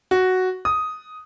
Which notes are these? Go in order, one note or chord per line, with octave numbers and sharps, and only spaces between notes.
F#4
D#6